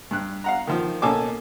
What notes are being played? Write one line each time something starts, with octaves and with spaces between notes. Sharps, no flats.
G2 F#6
F5 F#5 A#5
D#3 F3
B2 A#3 C#4 A4 G#5 D6